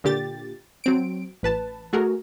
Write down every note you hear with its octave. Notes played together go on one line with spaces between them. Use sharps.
A#2 D3 G4 A6
F#3 C4 D7
A1 B4 A5
A3 F#4 G#4 A#4